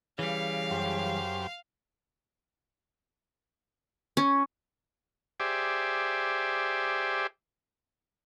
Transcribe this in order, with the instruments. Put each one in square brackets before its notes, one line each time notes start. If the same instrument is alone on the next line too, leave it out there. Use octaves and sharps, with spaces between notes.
[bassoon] C#3 [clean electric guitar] E3 G3 [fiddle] F5
[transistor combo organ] F#2 G4 C5
[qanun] C#4
[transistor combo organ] G4 G#4 C5 D5 E5